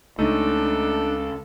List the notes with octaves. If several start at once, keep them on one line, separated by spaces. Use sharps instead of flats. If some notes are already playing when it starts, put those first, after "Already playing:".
C#2 A3 D4 D#4 A4